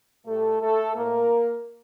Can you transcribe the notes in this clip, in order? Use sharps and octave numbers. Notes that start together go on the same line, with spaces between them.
A2 G3 A3 A4
A3 A4
A2 A3 A#3 A#4